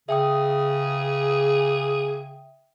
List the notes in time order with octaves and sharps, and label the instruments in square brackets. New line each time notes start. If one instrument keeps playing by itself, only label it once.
[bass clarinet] C#3 [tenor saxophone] G#4 [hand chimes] E5 G5 D#6